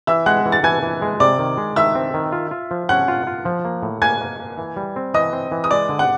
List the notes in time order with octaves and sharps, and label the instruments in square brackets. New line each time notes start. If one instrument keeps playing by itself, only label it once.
[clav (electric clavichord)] E3 [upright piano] E5 E6
[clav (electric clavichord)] G#3 [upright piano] F#5 F#6
[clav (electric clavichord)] E3
[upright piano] A6
[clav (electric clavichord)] E3 [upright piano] G#5 G#6
[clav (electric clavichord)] E3
G#3
[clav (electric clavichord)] C3 [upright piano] D5 D6
[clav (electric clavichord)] D#3
G#3
[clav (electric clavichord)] D#3 [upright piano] E5 E6
[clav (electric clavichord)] C4
D#3
F4
F4
F3
[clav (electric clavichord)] C#4 [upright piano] F#5 F#6
[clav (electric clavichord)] F4
F4
F3
A#3
A2
[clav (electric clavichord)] A#3 [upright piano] G#5 G#6
[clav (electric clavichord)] A#3
A#3
E3
G3
C4
[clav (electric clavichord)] E3 [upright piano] D#5 D#6
[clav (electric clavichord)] C4
E3
[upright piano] D#6
[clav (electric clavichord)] G#3 [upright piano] D5 D6
[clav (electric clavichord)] D3
[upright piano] F#5 F#6